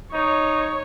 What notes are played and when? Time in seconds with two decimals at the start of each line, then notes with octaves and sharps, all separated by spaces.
0.13 D#4 C#5